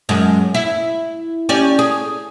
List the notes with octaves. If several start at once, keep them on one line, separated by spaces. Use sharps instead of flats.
F#2 G#3
E4
C#4 G4 D5
G#4